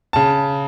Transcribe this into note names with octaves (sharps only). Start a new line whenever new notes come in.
C#3 A5